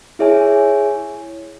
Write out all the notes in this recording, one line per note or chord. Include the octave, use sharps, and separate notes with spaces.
E4 G#4 C#5 E5 G#5